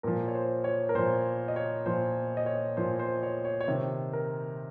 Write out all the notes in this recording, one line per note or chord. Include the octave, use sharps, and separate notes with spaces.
A#2 F3 A#4
C#5
C5
C#5
A#4
A#2 F3 C5
D#5
C#5
A#2 F3 C5
D#5
C#5
A#2 F3 C5
C5
C#5
C#5
C#5
C3 D#3 C5
A#4